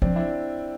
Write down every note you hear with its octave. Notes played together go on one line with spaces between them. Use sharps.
F3 C4 D4
D4 E4